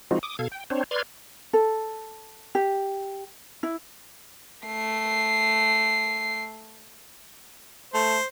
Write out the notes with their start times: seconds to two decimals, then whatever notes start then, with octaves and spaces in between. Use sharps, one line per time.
0.11 F3 G#3 C4 D#4 F4 F#4
0.23 D6 D#6
0.39 B2 A4 F5 G#6
0.52 G5
0.70 C4 D4 C5 C#5
0.91 B4 D5 C6 F6 G#6
1.53 A4
2.55 G4
3.63 E4
4.66 A3 C7
7.94 A3 C5